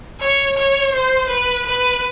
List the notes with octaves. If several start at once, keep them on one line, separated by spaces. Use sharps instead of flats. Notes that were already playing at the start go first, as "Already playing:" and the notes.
C#5
C#5
C5
B4
B4